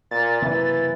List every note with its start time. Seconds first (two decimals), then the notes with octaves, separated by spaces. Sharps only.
0.11 A#2 A6
0.42 F#1 C3 E3 A#3